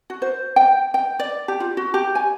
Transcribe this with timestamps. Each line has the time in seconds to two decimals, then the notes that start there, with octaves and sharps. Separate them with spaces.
0.10 F#4
0.22 C5
0.56 G5
0.94 G5
1.19 D5
1.48 G4
1.60 F4
1.77 F#4
1.94 G4
2.15 G#5